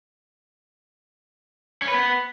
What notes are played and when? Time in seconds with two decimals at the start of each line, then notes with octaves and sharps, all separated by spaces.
1.82 C#4
1.88 B4
1.94 B3